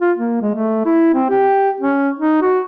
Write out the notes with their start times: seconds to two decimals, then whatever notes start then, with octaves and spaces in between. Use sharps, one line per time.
0.01 F4
0.17 A#3
0.42 G#3
0.54 A3
0.86 E4
1.14 C4
1.30 G4
1.81 C#4
2.19 D#4
2.42 F#4